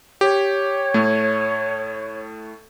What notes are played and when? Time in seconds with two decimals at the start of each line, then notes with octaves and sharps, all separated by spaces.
0.21 G4 C#5
0.94 A2 A3